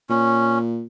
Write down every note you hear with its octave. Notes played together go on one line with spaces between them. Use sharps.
A#2 C#4